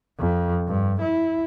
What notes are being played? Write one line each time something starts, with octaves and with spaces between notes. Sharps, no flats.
F2
G2
E4